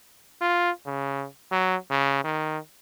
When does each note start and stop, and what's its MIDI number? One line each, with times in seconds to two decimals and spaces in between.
0.41 0.71 65
0.86 1.26 49
1.52 1.76 54
1.91 2.19 49
2.24 2.58 51